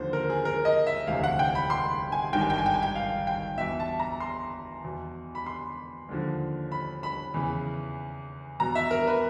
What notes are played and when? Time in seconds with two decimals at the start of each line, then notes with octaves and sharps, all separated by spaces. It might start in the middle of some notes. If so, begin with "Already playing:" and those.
Already playing: D#2 D3 F3 C5
0.13 A#4
0.30 G#4
0.45 A#4
0.65 D#5
0.87 E5
1.07 E1 D2 C3 E3 F5
1.24 F#5
1.39 G5
1.55 B5
1.70 C6
2.12 G#5
2.32 G#1 G2 D#3 G5
2.41 G#5
2.50 G5
2.58 G#5
2.66 G5
2.74 G#5
2.83 G5
2.96 F5
3.27 G5
3.58 E2 B2 E5
3.80 A5
4.00 A#5
4.20 C6
4.84 E2 B2
5.35 B5
5.46 C6
6.09 D#2 D3 F3
6.72 B5
7.03 B5
7.34 E2 C#3 E3
8.60 E2 B2 A#5
8.75 E5
8.91 A#4
9.07 B4